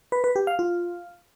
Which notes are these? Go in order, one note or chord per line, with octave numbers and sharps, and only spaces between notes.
B4
B4
G4
F5
F4